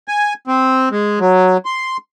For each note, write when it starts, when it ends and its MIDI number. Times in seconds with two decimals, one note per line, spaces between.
0.08 0.34 80
0.48 0.89 60
0.91 1.19 56
1.20 1.57 54
1.65 1.97 84